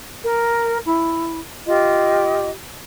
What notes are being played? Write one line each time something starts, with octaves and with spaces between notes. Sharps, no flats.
A#4
E4
F4 G4 D#5